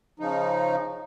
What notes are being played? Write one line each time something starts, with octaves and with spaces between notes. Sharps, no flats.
C#3 F3 D#4